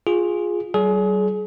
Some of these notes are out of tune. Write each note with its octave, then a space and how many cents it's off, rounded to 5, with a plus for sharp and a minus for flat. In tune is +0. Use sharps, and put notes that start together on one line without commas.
F4 +10 G#4 -5
G3 -40 G#4 +30 D5 -45